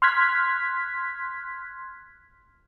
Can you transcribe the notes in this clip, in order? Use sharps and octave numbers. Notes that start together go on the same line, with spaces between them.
C6 F6 F#6 G#6 B6